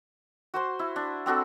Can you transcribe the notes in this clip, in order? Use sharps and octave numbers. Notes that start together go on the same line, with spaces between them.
F#4 C5 C6
E4
D4
C4 D4 F#4 A4